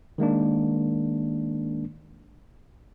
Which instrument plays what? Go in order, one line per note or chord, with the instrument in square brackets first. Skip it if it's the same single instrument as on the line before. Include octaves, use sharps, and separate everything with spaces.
[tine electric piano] D#3 G#3 A#3 D4